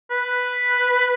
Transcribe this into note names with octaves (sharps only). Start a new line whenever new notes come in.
B4